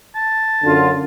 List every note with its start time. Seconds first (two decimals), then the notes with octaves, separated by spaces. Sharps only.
0.15 A5
0.64 F#2 D3 F4